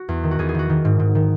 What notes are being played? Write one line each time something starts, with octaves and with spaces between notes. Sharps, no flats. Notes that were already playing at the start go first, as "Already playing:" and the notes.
Already playing: F#4
E2
D#3
F#4
E2 G#4
G#4
D#3 F#4
D#3
G#2
G#2
D#3